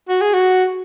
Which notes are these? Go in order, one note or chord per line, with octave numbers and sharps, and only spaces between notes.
F#4
G#4
F#4